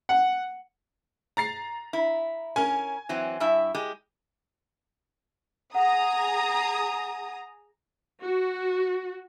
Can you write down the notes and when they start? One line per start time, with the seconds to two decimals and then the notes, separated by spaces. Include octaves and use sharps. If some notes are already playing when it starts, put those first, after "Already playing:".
0.09 F#5
1.37 A#5 A6 C7
1.93 E4
2.56 C#4 A#4 G#5
3.09 E3 F#3 C4
3.40 G2 E4 E5
3.75 G#3 G4
5.75 G#4 F#5 A#5 D#6
8.20 F#4